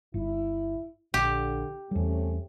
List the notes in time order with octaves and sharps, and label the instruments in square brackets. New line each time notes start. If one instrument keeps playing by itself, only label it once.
[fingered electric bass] G1 [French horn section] E4
[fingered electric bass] A#1 [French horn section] D3 [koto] G4
[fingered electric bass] E2 G3 [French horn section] C3 A3 C#4